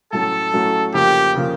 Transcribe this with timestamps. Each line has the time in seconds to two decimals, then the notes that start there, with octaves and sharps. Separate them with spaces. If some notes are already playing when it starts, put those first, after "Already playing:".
0.13 A2 F#3 A3 C#4 A4
0.54 A2 F#3 A3 C#4
0.94 F2 C#3 F3 A#3 G4
1.35 C#3 F3 A#3